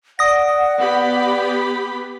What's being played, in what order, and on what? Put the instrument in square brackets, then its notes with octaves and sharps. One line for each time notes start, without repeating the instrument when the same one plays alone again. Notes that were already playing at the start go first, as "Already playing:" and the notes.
[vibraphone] D5 [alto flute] F#5 [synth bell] D#6 A#6
[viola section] B3 G4 B5